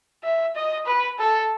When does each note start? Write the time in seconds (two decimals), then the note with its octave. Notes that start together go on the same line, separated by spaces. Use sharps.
0.23 E5
0.55 D#5
0.86 B4
1.19 A4